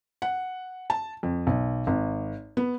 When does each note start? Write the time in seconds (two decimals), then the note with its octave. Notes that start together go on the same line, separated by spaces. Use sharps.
0.22 F#5
0.90 A5
1.23 F2
1.47 B1
1.87 G#1
2.57 B3